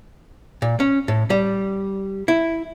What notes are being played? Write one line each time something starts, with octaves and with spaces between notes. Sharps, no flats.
A#2
C#4
A2
G3
E4